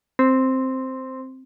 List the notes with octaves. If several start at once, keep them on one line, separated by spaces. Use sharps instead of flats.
C4